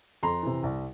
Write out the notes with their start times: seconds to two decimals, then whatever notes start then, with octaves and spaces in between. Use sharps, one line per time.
0.23 F2 A#5 C6
0.43 C3 E3
0.63 C2